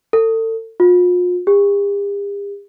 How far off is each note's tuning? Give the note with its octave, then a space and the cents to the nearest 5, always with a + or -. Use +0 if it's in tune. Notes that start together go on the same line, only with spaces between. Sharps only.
A4 +35
F4 +40
G4 +45